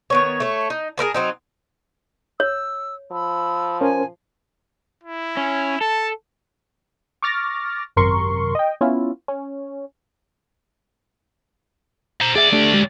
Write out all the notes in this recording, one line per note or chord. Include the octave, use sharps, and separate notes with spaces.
D#3 B3 C#5
A3 C#5
D#4
G#4 A#4 B4 A5
F#3 C4 D#4
C#5 E6
F3 B5 E6
C#4 A#4 C5 G#5
E4
C#4
A4 A5
C#6 D6 F6 A6 A#6
G#1 F#2 C3 A#4 C6 C#6
D#5 G5
B3 C#4 E4 F4
C#4
C5 A#5
D2 G#4 D5 E5
A3 D4 G4
G#3 G4